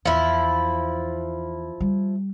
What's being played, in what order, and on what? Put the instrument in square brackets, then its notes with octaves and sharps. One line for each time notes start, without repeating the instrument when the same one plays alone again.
[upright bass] E2 [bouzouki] F3 E4
[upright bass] G3